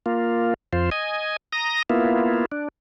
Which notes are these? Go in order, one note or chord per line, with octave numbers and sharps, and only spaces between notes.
A#3 F4
F2 F4 C5
D#5 G#5
A#5 D#6 A#6
A#3 B3 E4 F4
D4